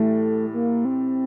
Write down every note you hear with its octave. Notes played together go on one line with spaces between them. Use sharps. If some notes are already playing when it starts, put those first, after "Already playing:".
Already playing: A2 E3 G3 A3
A#3
C4